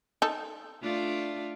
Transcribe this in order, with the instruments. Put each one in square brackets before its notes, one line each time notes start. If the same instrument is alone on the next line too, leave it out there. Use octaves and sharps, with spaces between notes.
[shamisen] D#4 A4
[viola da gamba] A3 D4 F4